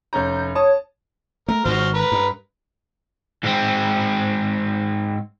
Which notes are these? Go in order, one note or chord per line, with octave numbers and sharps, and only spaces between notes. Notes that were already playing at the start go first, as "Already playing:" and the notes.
F1 C#4 A#5 G6
C#5 A5 D#6
A3 A#4
G#1 D#3 F#4 C5 F6
A#4 B4
G2
G#2 C4